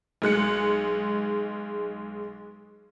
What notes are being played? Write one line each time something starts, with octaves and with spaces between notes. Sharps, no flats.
B1 G#3 F#6 C#7